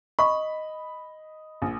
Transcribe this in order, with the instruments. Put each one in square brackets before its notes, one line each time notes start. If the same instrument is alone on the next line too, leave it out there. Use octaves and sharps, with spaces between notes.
[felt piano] D#5 [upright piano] B5 [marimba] C#6
[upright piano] A#1